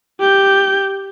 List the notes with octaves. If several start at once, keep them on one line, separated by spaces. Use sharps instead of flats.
G4 G6